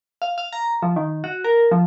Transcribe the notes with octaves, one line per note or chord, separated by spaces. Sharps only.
F5
F5
A#5
F3
D#3
F#4
A#4
F3